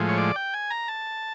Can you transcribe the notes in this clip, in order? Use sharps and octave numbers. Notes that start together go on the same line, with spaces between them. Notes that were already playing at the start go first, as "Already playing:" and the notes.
Already playing: A2 F3 G#3
C#5
D5
G5
G#5
A#5
A5